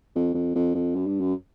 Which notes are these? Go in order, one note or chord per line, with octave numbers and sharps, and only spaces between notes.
F2
F2
F2
F2
F#2
G2
F#2